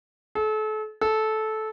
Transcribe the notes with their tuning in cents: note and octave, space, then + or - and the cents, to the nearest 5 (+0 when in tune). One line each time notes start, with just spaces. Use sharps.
A4 -35
A4 -15